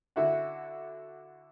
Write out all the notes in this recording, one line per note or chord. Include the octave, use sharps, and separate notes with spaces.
D3 E4 F#4 E5 F#5